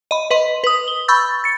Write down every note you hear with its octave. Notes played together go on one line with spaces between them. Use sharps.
D#5 B5
B4 D#5 C6
B4 D#6
G7
B5 C#6 E6 G6 A6
A6 C#7